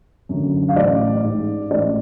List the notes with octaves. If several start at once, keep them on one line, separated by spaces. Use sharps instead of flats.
F#2 D3
F5
A1 D5
G#2
A1 D5